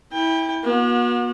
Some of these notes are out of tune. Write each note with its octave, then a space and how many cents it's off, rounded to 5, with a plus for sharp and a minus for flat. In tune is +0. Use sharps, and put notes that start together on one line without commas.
E4 -20 G5 +25
B3 -45 F#4 -35